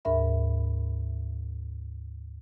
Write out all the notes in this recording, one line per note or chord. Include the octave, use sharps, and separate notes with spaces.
D2 G#2 A#4 E5 B5